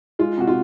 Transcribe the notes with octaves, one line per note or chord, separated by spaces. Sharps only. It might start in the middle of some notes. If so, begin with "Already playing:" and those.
G#3 F4
C3 F#4
F4